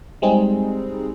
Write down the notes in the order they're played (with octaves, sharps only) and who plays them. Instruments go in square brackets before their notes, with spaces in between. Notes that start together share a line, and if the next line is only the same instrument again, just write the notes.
[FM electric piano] G3 G#3 C4 D#4 G#4